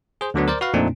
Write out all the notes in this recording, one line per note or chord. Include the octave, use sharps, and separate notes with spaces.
G#4 C5
D2 D3 F#3 B3
A#4 C5 D5
F#4 B4 F5
F2 A#2 A3 C4 D4 D#4